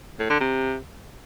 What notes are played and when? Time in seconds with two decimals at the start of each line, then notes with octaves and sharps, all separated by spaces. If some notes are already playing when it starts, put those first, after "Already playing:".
0.19 A2
0.30 D3
0.40 C3